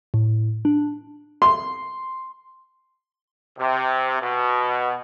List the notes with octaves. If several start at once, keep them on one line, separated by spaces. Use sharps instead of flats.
A2
D4
C6
C3
B2